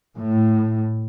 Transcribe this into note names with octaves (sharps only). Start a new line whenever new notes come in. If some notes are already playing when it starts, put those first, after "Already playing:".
A2